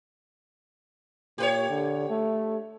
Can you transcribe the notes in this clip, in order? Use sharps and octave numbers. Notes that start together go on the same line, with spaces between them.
A#2 G4 B4 C#5
D3
A3